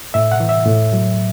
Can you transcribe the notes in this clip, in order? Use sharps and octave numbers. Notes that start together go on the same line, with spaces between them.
A2 E5
F#5
E3
E5
A2
F#3